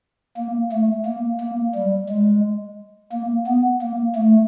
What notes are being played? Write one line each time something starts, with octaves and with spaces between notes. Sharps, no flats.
A#3
A3
A#3
A#3
G3
G#3
A#3
B3
A#3
A3